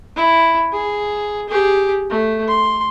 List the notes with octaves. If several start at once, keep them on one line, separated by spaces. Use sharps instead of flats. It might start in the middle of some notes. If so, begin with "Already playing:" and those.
E4
G#4
G4 G#4
A3
C6